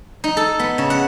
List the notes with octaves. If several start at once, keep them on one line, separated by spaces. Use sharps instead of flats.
D#4
A4
B3
C#3
F#5